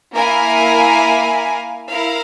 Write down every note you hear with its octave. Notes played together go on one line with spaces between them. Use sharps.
A#3 E4 A#4 F5 G#5
E4 A#4 F5